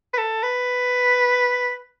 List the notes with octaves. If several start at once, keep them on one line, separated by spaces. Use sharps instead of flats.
B4
A4
B4